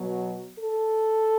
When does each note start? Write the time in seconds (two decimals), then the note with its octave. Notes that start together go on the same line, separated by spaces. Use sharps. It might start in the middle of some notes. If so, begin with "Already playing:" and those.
Already playing: B2 F#3
0.58 A4